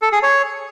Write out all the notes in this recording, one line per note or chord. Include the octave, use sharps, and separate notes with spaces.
A4
G#4
C#5